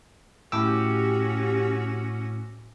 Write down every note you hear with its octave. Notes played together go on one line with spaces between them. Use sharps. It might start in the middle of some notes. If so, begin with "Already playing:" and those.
A2 C#4 F#4 G4 D6 E6